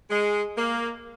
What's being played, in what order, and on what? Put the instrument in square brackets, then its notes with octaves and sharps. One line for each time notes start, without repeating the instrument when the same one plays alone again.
[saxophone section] G#3
A#3